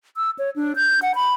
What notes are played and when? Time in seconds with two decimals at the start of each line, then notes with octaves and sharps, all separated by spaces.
0.17 E6
0.39 C#5
0.56 D4
0.76 G6
1.02 F#5
1.15 B5